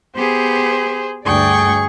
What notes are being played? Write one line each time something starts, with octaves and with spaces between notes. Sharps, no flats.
B3 G4 G#4 C5
D2 G2 G#4 D5 G5 C#6